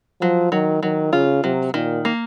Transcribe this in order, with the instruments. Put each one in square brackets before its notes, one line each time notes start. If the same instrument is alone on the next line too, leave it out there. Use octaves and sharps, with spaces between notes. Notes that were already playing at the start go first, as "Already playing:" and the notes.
[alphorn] F3 [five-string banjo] F#3
[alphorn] D#3 [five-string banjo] F#3
[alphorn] D#3 [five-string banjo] F#3
[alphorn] C#3 [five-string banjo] F4
[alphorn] C3 [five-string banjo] F#3
[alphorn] A#2 [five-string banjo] D#3
[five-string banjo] A#3